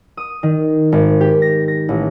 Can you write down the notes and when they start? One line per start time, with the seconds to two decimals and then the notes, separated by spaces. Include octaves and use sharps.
0.17 D#6
0.43 D#3
0.92 G#1
1.21 G4
1.42 A#6
1.68 A#6
1.89 A1